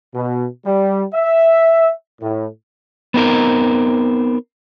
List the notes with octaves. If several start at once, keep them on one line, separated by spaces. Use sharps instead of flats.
B2
G3
E5
A2
B3 C4 D#4 A#4